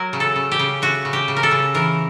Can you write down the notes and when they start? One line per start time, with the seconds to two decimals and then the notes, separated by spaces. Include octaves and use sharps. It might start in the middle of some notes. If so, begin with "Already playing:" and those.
Already playing: F#3 A#4
0.13 C#3
0.20 A4
0.36 C#3
0.52 G4
0.59 C#3
0.82 A3 F#4
1.05 C#3
1.13 G4
1.28 C#3
1.37 A#4
1.43 A4
1.51 C#3
1.74 E3 A#4